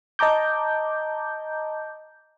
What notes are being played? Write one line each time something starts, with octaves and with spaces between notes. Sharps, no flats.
D#5 A5 A#5 D6 G6